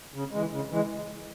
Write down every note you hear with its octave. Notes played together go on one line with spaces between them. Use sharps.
C#3
E3 G#3
C#3
E3 G#3